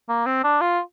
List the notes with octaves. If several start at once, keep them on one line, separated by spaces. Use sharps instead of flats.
A#3
C4
D4
F4